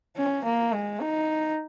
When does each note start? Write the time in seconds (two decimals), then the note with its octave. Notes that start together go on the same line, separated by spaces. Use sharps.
0.17 C#4
0.44 A#3
0.73 G#3
1.01 D#4